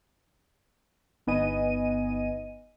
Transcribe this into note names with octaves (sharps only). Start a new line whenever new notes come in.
G1 B3 D#4 D#5 G#5 D#7